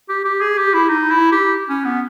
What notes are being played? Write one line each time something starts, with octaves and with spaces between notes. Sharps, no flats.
G4
G4
G#4
G4
E4
D#4
E4
G4
C#4
B3